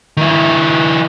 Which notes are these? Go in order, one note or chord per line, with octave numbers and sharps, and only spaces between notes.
D#3 E4